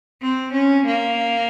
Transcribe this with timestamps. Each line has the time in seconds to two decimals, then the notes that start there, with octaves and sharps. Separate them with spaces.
0.22 C4
0.54 C#4
0.86 A#3